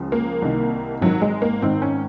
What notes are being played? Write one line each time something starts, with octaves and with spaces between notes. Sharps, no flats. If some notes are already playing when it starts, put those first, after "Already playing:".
Already playing: C#2 C#3 F3
A#3
C2 C3 D#3
G#1 G#2 D#3 F#3
G#3
A#3
G#1 G#2 D#3 C4
C#4